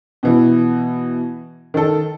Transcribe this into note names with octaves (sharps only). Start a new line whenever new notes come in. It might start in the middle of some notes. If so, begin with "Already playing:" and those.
B2 E3
D#3 A4